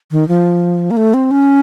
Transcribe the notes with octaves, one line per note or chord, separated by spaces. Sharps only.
D#3
F3
A#3
A3
C4
C#4